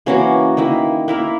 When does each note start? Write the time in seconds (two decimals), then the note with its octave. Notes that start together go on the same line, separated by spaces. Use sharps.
0.06 E3 A#3 C#4 F#4
0.57 D#3 A#3 E4
1.08 A#3 E4 A#4